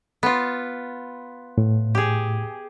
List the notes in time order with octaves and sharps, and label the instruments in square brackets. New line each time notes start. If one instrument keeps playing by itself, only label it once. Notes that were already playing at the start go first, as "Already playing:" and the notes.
[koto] B3 F4
[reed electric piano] A2
[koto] G4 G#4